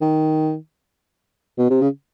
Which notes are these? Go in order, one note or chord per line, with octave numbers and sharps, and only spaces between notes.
D#3
B2
C3
C#3